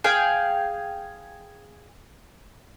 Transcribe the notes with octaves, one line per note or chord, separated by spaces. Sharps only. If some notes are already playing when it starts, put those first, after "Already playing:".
G#4 F5 G5